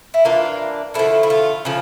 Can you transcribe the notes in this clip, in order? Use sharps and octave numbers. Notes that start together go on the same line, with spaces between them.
E4
E3 A#3 D4 F4
D3 F3 A3 E4
E4
F4
C#3 F3